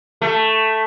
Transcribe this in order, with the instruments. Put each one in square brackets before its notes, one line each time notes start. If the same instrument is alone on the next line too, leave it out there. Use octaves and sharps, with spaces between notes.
[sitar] A3